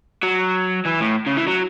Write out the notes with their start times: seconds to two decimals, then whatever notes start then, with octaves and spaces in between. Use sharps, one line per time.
0.23 F#3
0.85 E3
1.01 A2
1.26 C#3
1.37 E3
1.47 F#3